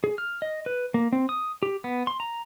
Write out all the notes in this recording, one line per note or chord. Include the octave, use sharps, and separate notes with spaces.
G#4
F6
D#5
B4
A#3
C4
D#6
G4
B3
C6
A#5